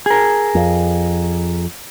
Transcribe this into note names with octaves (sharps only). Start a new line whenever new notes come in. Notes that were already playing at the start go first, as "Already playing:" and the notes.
G#4 A#4
F2